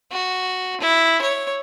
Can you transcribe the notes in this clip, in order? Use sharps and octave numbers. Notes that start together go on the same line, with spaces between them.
F#4
E4
C#5